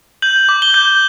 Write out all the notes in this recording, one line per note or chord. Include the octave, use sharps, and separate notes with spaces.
G6 F#7
D6
G7
G6